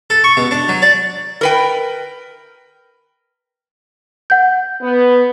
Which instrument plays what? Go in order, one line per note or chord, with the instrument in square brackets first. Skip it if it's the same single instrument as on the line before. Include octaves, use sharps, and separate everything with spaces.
[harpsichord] A4
C#6
B2
D4
F#3
D5
[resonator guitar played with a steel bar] A#4 B4 G5
[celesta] F#5 G6
[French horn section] B3